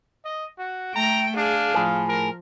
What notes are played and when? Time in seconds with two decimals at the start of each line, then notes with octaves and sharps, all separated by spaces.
0.25 D#5
0.59 F#4
0.96 A3 G5 A#5
1.37 D4 G#4 F5
1.74 A2 F3 G#4
2.09 A#4